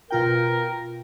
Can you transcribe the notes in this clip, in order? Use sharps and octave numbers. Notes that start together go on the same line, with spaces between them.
B2 F4 A#4 G5